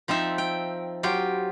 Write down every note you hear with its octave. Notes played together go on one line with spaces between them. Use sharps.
F3 C4 D#4 E5
G5
F#3 F4 G4 G5